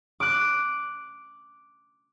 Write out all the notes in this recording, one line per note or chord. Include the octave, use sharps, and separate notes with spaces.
D6 F#6